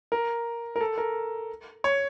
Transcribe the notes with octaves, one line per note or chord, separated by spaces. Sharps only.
A#4
A#4
A4
A#4
C#5